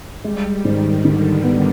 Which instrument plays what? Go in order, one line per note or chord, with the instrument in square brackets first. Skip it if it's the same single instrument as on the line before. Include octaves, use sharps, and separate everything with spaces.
[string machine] G3 [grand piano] G#3
[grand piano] G#2 [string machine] D#3
[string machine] D3 [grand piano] D#3
[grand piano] B3